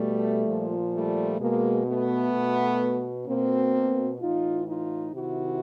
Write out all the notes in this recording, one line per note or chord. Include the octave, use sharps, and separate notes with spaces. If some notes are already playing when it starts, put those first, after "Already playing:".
Already playing: B2 G3 A3
A#2 F3
G3 A3
B2 G#3 A#3
A3 B3
B2
B2 A#3 C4
A2 E3 D#4 F4
D#4 F4
C3 D#3 E4 F#4